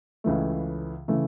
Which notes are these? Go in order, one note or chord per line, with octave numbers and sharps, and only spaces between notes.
C#2 C#3 E3 A3
C#3 E3 A3